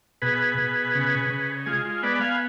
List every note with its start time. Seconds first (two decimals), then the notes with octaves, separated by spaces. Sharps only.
0.22 B2 G#4 B4
0.58 B2
0.95 C#3
1.30 C#3
1.66 G#3 F4 G#4
1.85 F4
2.03 B3 B4 D5
2.20 F5 G#5